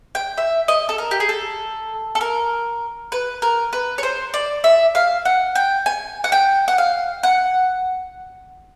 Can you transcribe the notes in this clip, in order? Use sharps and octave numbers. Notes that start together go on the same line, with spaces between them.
G5
E5
D#5
A4
A#4
G4
G#4
A4
A4
A#4
B4
A#4
B4
C#5
C5
D5
E5
F5
F#5
G5
G#5
F#5
G5
F#5
F5
F#5